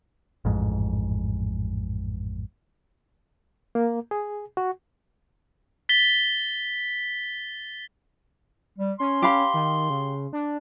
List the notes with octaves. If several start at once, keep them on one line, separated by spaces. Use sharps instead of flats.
A1 F2 G#2
A#3
G#4
F#4
A6 B6 G7
G3
C#4 C6
G4 F5 B5
D#3
C#3
D4